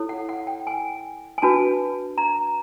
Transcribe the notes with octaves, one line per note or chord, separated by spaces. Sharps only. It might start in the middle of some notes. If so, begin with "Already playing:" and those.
Already playing: E4 A4 C#5
F#5
F#5
G5
G#5
G#5
D4 F#4 B4 A5
A#5